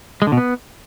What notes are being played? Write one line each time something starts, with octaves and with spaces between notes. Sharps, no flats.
G#3
D3
B2
B3